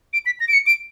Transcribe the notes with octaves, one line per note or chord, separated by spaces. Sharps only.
D7
B6
A#6
D7
C#7
D7